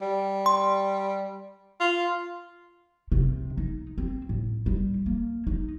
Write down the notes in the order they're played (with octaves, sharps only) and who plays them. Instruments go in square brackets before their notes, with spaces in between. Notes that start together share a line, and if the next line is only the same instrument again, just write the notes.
[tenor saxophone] G3
[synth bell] C6
[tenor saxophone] F4
[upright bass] C3
D#4
C4
A2
G3
A#3
D#4